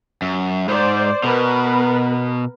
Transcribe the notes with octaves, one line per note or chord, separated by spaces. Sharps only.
F#2
G#2 C5 D5
B2 B3 A#4 B4